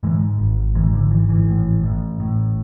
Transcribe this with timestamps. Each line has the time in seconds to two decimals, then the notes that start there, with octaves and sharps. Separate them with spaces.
0.03 G#2 E3 G#3
0.38 G#1
0.75 G#2 E3 G#3
0.92 D3 F3
1.11 G#1 E3
1.29 E3
1.48 A2
1.83 A1
2.20 A2